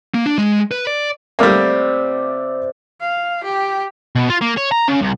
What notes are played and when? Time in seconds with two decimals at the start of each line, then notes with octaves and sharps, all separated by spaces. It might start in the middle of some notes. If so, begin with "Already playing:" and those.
0.14 A#3
0.26 D4
0.38 G#3
0.71 B4
0.87 D5
1.39 C3 G3 A3 A#3 D5
3.00 F5
3.44 G4
4.16 B2
4.30 F4
4.41 A#3
4.57 C#5
4.72 A#5
4.88 C#3
5.02 C2